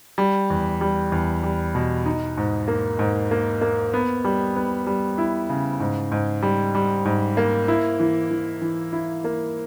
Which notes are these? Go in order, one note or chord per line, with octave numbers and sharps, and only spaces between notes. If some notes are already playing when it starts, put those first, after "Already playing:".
G3
E2
G3
E2
G3
B2
D#4
G#2
A#3
G#2
A#3
A#3
B3
G3
B3
G3
E4
C#3
G#2
G#2
G3
G3
G#2
A#3
E4
E3
E3
E3
E4
A#3